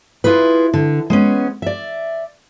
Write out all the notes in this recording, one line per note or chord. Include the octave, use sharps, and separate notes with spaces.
E4 F4 G#4 B4
D3
G#3 B3 C#4
D5 E5